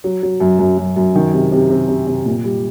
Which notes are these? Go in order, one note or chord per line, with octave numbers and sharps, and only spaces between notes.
F#3
F#3
F#2
F#2
F#2
F#2
D#3
C3
C3
C3
C3
C3
A#2
G3